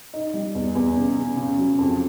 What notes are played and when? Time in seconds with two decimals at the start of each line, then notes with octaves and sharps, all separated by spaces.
0.14 D#4
0.34 G3
0.55 E2
0.75 E2
0.96 C#3
1.17 C#3
1.37 C#3
1.58 F#3
1.78 F2